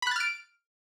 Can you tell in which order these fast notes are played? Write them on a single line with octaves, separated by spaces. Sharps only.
B5 F#6 A6 F6 D7